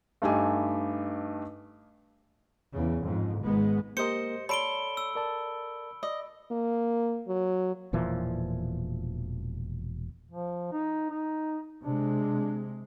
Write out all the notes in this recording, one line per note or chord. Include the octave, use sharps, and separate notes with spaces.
G2 A3 D#4 G4 D#5 G#5
E2 C#3
F2 G#2
G#1 G#2 G#3 B3
A#3 G4 A#4 C5 D#5 C#7
A4 C#5 D5 B5 C6 D7 G7
E6
A#4 D5 A5
D5 D#5
A#3
F#3
E1 A#2 E3 F3
F3
D#4
D#4
C3 G#3 D4